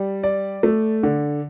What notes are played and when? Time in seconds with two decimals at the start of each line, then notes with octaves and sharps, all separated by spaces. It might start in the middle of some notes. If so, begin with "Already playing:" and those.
Already playing: G3
0.23 D5
0.63 A3
1.03 D3